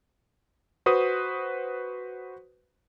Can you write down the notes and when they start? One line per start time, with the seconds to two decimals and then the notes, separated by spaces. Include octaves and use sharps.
0.86 F#4 B4 C5 D#6